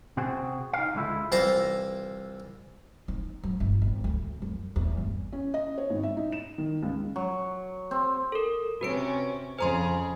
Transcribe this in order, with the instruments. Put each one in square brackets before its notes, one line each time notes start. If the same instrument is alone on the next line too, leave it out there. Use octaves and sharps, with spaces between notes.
[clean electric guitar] C3 C4 F#4 G#4
D#4 F5
C#2 D3 G#3 E4 F4
[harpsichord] C2 E3 F4 C5 F5 A#5
[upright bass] D#4
F#3
G1
G#1
D2
F#2
E2
G1
[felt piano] C#4
D#5
C#5
G#1
E5
D#4
E7
D#3
C#2
[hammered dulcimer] F#3
C4
[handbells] A4 A#4
[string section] C3 C#4 [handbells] F#4 B4 D7
[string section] F2 C#3 G#4 [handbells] C5 A#5 C6